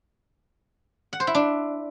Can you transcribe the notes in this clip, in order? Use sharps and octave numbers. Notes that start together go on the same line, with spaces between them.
F#5
C5
E4
D4